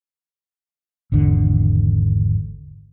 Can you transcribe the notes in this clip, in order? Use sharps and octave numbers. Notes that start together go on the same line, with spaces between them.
G#1 E2 D3